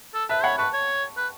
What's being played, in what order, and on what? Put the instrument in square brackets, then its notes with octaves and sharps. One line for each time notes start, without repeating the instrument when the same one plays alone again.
[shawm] A4
[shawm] B4 [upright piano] E5 A5
[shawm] C#5 [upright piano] F#5 B5
[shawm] B4 [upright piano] A5 C#6
[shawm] C#5
B4